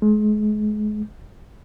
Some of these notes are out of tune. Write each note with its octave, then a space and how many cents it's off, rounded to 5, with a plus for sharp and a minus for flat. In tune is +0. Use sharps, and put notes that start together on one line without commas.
G#3 +35